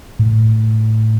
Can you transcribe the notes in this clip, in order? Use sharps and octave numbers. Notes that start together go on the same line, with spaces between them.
A2